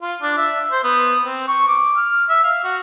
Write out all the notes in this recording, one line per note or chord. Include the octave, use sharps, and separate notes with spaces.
F4
D4
E5
C5
B3
C4
C#6
D6
F6
E5
F5
F#4